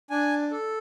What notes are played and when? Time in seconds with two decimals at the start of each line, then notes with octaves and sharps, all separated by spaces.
0.10 D4 G#5
0.51 A4